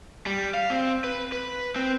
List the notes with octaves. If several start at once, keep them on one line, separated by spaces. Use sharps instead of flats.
G3
F5
C4
B4
B4
C4